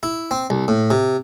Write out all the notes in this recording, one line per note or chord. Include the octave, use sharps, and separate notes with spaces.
E4
C4
C2
A2
C3